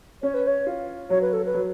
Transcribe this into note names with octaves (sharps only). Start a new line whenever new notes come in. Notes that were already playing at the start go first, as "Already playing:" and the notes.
C#4 C#5
B4
C#5
F4
F#3 C#5
B4
A4
B4
F#3